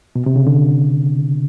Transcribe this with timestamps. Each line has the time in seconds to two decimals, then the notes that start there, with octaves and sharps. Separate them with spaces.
0.16 B2
0.26 C3
0.36 C#3
0.47 D3